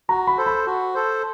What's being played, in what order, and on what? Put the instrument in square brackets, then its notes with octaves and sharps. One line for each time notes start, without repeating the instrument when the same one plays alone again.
[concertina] F#4 [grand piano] A#5
[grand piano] B5
[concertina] A4 C5
[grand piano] B5
[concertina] F#4
A4 C5